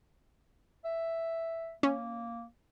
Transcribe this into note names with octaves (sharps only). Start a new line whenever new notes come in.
E5
A#3 C#4